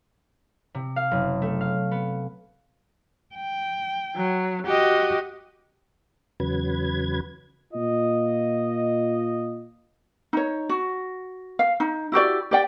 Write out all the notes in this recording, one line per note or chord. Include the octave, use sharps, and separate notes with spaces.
C3
F5
F#1
A3
F5
B3
G5
F#3
F#4 G4 D#5
E2 C#3 F#3 B4 G#6
A#2 F4 D#5
D#4 C#5
F#4
F5
D#4
E4 F#4 G4 D5
G4 D5 G5